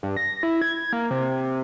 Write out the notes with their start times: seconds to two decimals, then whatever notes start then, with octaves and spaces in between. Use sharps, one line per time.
0.03 G2
0.17 A#6
0.43 E4
0.62 G#6
0.93 A#3
1.11 C3